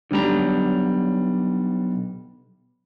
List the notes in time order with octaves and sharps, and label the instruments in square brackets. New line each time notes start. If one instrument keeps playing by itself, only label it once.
[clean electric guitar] B1 A#5 [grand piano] D3 G3